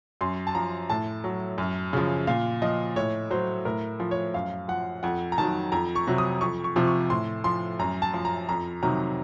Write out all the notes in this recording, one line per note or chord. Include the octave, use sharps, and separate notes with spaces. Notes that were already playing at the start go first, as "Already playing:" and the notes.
F#2 C6
A5
F3 A#5
A2 A5
F#3
F#2
C#3 F3
A#2 F5
F3 D#5
A2 C#5
F#3 C5
A2 A#4
F3
C#5
F#2 F5
F3 F#5
F2 F#5
A#5
D#3 F#3 A5
F2 A#5
C#6
C3 F#3
D#6
F2 C#6
C#6
C3 F3
C#6
A2 C6
F3 C6
F#2 A#5
A5
F3
A#5
F2 A#5
C3 D#3 F#3 A#5